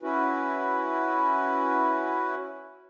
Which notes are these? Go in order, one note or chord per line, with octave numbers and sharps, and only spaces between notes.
C#4 E4 F#4 B4